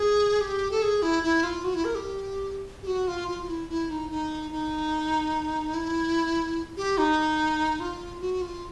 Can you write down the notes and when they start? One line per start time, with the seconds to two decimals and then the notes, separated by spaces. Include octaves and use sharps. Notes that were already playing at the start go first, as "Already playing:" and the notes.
Already playing: G#4
0.41 G4
0.71 A4
0.82 G#4
1.02 E4
1.23 E4
1.43 F4
1.64 F#4
1.74 E4
1.85 A#4
1.95 G4
2.83 G4
2.87 F#4
3.08 F4
3.28 F4
3.43 F4
3.48 E4
3.69 E4
3.90 D#4
4.10 D#4
4.51 D#4
5.74 E4
6.77 G4
6.98 D#4
7.80 F4
8.21 F#4
8.42 F4